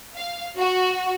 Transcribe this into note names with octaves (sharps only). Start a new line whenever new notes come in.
F5
F#4